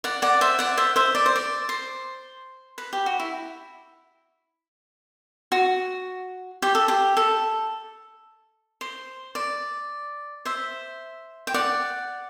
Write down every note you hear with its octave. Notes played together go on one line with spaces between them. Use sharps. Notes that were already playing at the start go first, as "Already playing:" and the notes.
D5 F#5
D5 F#5
C5 E5
D5 F#5
C5 E5
C5 E5
D5
C5
D5
C5
B4
G4
F#4
E4
F#4
G4
A4
G4
A4
C5
D5
C5 E5
G5
D5 F#5